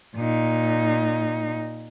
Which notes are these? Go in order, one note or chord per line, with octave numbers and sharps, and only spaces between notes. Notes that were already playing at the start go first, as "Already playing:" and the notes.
A#2 D#4